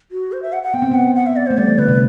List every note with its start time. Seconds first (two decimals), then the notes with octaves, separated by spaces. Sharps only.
0.11 F#4
0.32 C5
0.42 E5
0.53 F#5
0.63 F#5
0.74 B3 G5
0.82 C4
0.92 B3 F#5
1.16 F#5
1.27 E5
1.36 D5
1.47 A3 C5
1.57 G3 D5
1.68 E3
1.78 D3 B4
1.88 C3